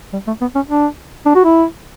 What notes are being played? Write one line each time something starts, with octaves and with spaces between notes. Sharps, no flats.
G3
A3
B3
C#4
D4
D4
F#4
E4